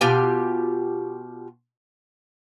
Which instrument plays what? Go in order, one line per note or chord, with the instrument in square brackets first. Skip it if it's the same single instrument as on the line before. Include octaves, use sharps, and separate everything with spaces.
[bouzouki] B2 F4 G4 G#5